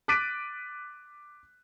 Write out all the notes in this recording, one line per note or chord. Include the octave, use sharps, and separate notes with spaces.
D6 F#6 A6 B6 D7 D#7